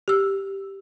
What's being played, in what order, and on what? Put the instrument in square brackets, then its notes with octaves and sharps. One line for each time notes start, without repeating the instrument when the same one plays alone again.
[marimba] G4 E6